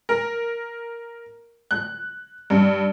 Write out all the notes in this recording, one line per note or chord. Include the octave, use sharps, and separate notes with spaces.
A#4
F#6
G2